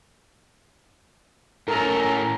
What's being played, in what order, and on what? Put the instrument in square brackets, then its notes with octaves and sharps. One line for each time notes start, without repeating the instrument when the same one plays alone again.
[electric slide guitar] A2 C#4 [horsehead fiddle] A4 A#5 [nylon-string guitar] A#4